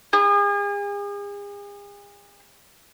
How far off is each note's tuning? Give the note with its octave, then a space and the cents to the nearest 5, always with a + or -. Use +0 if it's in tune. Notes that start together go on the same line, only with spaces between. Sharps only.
G#4 -40